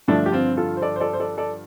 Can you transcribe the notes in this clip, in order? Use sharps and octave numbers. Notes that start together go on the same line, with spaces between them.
G2 D3 F3 A3 D4
G4
C4 F4
F4 A4
C5
A4 D5
C5
A4 D5
C5
A4 D5
A4 D5